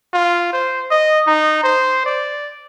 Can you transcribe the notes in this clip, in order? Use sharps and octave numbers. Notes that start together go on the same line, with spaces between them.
F4
C5
D#5
D#4
C5
D5